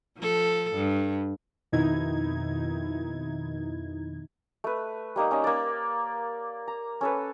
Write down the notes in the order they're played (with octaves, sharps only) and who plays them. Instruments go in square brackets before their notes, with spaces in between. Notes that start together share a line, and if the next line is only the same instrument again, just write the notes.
[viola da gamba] F3 A4
G2
[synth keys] F2 B2 D#3 D#4 E4 G#6
[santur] A3 B4
G3 A#3 D#4
C#4 D#4 D#5
A#3 D5
A#5
C#4 A4 B4